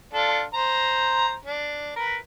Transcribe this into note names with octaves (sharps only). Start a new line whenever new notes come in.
D4 F4 A4
C5 A#5
D4
A#4 B4